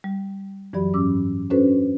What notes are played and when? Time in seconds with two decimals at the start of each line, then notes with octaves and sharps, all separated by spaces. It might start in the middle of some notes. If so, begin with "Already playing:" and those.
0.04 G3
0.73 F#2 E3 F#3 G4 D5 B5
0.94 G#2 C#4 D6 E6
1.50 C#4 D4 F#4 A4 B4 C5